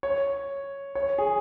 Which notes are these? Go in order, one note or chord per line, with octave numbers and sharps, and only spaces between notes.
C#5
C#5
G#4